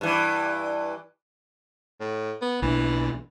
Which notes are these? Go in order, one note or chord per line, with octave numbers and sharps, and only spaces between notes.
G2 E3
A2
B3
B1 E3 C4 D4